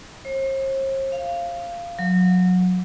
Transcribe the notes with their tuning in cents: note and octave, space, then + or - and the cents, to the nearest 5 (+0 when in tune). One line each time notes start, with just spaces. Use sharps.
C5 +45
F5 -15
F#3 -25